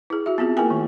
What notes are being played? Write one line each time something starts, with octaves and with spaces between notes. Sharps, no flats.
E4 G#4
F#4 E5
B3 C4 F4 G#4
A#3 E4 G#4 A#4 G5 G#5
D#3 A3